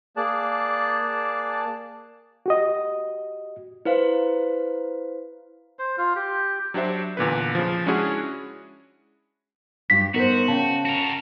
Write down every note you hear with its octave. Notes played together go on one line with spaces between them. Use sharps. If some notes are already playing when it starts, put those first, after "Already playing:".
A#3 G#4 D5 A5 F#6
F#4 G4 D#5
E4 B4 C5 F5
C5
F4
G4
F#3 D4 G4 C5 E5
E2 A#2 D3 B4
C#3 F3
G#3 C#4 D4 E4 F#4 G#4
G2 G4 B6
B3 D#4 F#4 A#4 C5
C#3 G5 A5
F#4 A#4